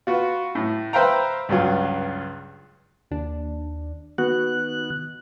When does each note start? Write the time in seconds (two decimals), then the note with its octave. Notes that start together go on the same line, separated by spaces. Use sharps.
0.07 F4 F#4 B4
0.55 A2
0.93 B4 C5 E5 F5 G5 A#5
1.49 C#2 G2 F#3 F4
3.11 D#2 D4
4.18 D#3 B3 F#4 F#6